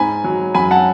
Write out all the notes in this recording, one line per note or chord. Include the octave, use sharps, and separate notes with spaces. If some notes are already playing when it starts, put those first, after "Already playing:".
Already playing: G#2 G#5 B5
F#3
F#2 G#5 B5
F#5 A5